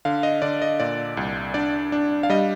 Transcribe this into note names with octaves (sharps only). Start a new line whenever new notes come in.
D3 F5
D#5
D3 D5
D#5
A#2 D5
C2
D4 D5
D4
F5
G3 D#5